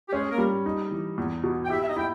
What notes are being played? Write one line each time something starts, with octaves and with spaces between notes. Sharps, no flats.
G4
G#3 C#4 G#4
A#3 A#4
G3
D#4
E3
E2
B2
G5
E4 G4 E5
E5
D#4 D#5
E4 G5